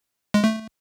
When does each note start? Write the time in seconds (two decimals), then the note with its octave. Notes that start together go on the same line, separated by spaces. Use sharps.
0.34 G#3
0.44 A3